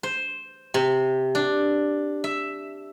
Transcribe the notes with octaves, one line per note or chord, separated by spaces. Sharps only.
C5
C3
D4
E5